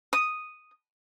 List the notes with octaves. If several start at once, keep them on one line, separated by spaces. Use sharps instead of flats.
D#6